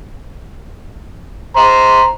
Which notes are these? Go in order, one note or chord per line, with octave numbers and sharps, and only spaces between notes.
C5 A#5